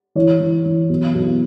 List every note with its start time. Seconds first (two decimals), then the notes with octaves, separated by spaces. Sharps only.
0.15 E3 C#5
0.40 E3
0.65 E3
0.89 B1
1.15 B1